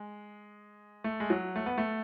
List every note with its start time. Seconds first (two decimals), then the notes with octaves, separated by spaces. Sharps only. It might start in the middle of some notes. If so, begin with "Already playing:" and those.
Already playing: G#3
1.04 A3
1.20 G#3
1.30 F#3
1.56 A3
1.66 B3
1.78 A3